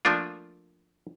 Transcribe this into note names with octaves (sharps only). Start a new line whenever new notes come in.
F3 A3 A#3 D4 F4